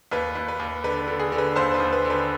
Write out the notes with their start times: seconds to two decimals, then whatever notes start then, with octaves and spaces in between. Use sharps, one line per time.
0.11 D#2 B4
0.35 D#2
0.48 B4
0.60 D#2
0.84 D3 B4
1.08 D3
1.20 G#4
1.32 D3
1.38 B4
1.56 D#2 C5
1.74 B4
1.80 D#2
1.93 B4
2.05 D3
2.10 B4